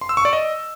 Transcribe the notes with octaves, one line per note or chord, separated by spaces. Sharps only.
C6
E6
C#6
D5
D#5